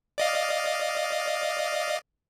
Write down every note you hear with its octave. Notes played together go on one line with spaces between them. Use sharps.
D5 D#5 F5